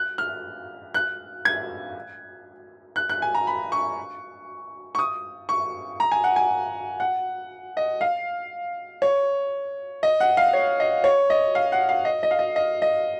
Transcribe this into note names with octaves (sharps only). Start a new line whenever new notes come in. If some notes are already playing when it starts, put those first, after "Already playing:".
Already playing: F#6
F6
F#6
G#6
F#6
F#6
G#5
A#5
B5
C#6
C#6
D#6
C#6
A#5
G#5
F#5
G#5
F#5
D#5
F5
C#5
D#5
F#5
F5
C#5
D#5
C#5
D#5
F5
F#5
F5
D#5
D#5
F5
D#5
D#5
D#5